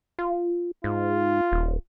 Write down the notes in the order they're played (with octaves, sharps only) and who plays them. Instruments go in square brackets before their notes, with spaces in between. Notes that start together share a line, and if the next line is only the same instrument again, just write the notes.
[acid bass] F4
[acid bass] G#2 [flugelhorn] F4
[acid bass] D#1